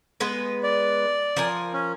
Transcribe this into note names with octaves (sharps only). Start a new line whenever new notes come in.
G#3 B3 B4
D5
F3 A#4 G#5
C#4